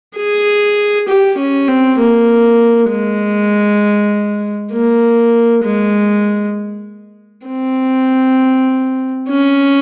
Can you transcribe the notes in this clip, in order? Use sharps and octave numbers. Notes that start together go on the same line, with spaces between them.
G#4
G4
C#4
C4
A#3
G#3
A#3
G#3
C4
C#4